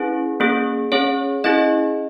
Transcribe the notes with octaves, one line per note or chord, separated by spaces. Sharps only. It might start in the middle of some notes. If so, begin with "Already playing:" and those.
Already playing: C#4 E4 G#4 B4
A#3 C#4 G#4
C#4 G#4 C#5
C#4 E4 G#4 D#5